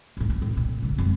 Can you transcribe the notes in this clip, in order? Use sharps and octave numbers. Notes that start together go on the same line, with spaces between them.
D#2 A2
D#3
A2
A#2
G#2 D3
F2 G#3